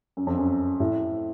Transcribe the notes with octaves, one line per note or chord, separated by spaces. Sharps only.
F#2
F2
F#2
A2